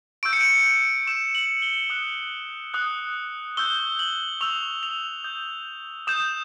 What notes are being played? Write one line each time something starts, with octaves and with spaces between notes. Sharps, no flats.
C#6 E6 G6 D7
C#7
D7
C#6 E6 G6 E7
F#7
G7
D#6 F#6
D#6 F#6
C#6 E6 G6 G7
F#7
C#6 E6 G6 F7
F7
D#6 G6
D#6 G6 E7